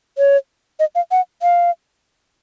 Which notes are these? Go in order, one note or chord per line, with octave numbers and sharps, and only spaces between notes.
C#5
D#5
F5
F#5
F5